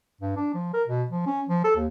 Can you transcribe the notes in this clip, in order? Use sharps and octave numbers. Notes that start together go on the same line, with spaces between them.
G2
D4
F3
A#4
B2
F3
C#4
F3
A4
D#2